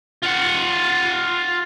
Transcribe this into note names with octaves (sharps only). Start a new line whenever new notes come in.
F4 F#5